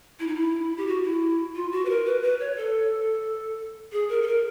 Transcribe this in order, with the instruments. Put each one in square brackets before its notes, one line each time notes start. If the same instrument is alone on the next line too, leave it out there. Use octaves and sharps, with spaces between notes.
[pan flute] E4
D#4
E4
G4
F#4
E4
F4
F#4
B4
A#4
B4
B4
C#5
A4
G#4
A#4
A4
A#4